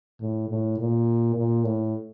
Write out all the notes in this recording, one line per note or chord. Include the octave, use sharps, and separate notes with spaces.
A2
A2
A#2
A#2
A2